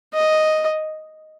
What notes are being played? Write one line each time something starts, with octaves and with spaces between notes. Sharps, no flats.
D#5